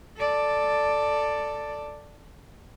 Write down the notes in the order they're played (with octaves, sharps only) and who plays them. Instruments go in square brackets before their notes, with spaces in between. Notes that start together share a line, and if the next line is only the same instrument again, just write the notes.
[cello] A4 D5